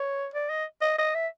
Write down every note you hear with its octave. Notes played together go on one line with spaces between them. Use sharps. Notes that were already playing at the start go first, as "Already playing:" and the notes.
Already playing: C#5
D5
D#5
D#5
D#5
E5